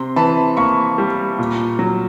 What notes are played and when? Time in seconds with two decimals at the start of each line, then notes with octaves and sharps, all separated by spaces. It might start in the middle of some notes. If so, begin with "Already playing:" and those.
Already playing: C3 C6
0.16 E3 A5 B5
0.57 A#3 B5 C#6
0.98 G3
1.39 A#2
1.79 F#3